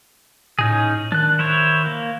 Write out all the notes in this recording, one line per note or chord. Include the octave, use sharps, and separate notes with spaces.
A2 C#4 D#4 G#4
D#3 D4 F#6
E4 C5 C#5
A#3